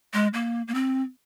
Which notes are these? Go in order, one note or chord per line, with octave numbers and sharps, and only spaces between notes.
G#3
A#3
A#3
C4